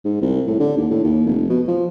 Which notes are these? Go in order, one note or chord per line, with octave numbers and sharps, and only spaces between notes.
G#2
C2
A2
D3
D#2
A2
D#2
F1
B2
F3